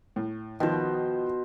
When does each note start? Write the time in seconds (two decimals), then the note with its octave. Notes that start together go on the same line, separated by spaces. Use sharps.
0.16 A2
0.60 B2 D#3 F3 C5